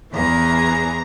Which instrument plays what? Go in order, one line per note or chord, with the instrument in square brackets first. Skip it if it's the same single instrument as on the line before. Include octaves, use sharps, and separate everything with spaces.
[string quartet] E2 E3 G#4 A#5